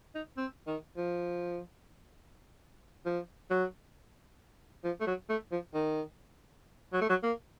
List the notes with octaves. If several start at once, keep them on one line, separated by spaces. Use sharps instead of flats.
D#4
C4
D#3
F3
F3
F#3
F3
A3
F#3
A3
F3
D#3
F#3
A3
F#3
A#3